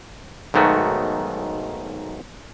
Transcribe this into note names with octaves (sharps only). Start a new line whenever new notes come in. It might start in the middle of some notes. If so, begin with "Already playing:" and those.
B1 G#2 D#3 A3 F#4